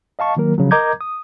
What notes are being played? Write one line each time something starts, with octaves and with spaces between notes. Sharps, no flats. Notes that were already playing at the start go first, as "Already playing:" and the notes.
D#5 F5 A5 C#6
D#3 F#3 A#3 A#4
C#3 F3 F#3
A#4 D#5 A#5 D6 G6 G#6
D#6